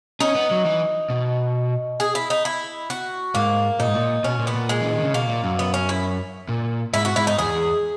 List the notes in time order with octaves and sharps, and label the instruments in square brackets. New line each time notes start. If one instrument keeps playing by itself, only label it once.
[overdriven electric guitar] C#4 [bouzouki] D#4
[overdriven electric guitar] B3
F#3
E3
B2
[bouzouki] G#4
E4
D#4
E4
F#4
[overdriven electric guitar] G#2 [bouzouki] A#3
[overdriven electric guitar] A#2 [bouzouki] D#4
[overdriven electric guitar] G#2
A#2
[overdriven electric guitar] B2 [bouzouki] C#4
[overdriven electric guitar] A#2
[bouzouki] B3
[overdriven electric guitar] A#2
[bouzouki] G#3
[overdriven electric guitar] E3
D#3
C#3
[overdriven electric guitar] B2 [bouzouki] A#3
[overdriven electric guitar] A#2
F#2
[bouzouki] B3
C#4
E4
[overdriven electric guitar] A#2
[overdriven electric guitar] G#2 [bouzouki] E4
[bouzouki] F#4
[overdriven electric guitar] G#2 [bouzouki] E4
[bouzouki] D#4
[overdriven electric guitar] E2 [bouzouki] G#4